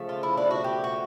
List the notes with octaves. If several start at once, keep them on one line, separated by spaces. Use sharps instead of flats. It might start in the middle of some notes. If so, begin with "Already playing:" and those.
Already playing: C#3 F3 A3
F4
E4
D4
F#4
G4
F#4